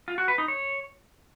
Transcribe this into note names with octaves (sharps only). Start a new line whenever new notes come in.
F4
F#4
B4
D#4
C#5